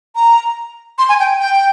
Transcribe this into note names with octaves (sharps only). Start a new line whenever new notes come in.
A#5
C6
G#5
G5
G5